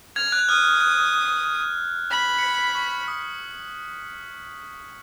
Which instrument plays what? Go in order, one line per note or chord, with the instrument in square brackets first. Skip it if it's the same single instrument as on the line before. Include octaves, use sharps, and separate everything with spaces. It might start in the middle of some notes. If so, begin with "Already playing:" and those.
[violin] F6 [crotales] G#6
[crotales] F#6
[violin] D#6 [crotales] F6
[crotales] F6
F#6
[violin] B5 [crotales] B6
[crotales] C#7
B6
C#6
D#6